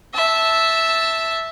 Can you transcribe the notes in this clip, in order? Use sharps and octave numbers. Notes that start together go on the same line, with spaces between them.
E5 A5